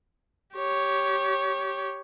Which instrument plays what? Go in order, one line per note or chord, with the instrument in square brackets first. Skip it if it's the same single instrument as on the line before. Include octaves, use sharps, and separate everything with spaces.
[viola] G4 C#5